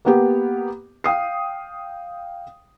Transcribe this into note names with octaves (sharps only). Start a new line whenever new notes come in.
A#3 B3 G4
F5 G5 D#6 C7